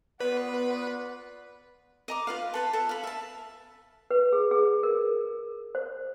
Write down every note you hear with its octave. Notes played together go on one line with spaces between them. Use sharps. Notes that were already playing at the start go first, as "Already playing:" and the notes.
B3 F4 B4 D5 F#5
D#5 A#5 D6
F4 B4 F5
A4 B4 A5
A4 E5
F5 B5
E5 A5
B4
G#4
G#4
A#4
C5